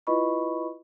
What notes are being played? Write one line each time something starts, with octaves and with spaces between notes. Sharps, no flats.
E4 F4 B4 D#5 B5 C#6